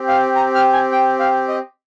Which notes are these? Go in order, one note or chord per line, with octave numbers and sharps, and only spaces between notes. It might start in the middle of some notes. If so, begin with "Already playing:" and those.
Already playing: C4 G4
F5
A#5
F6
G#5
G5
F5
D#5